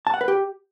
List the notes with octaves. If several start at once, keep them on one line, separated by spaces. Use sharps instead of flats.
A5
F#5
B4
G4